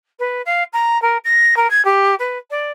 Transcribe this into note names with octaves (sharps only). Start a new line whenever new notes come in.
B4
F5
A#5
A#4
A#6
A#4
G#6
G4
B4
D5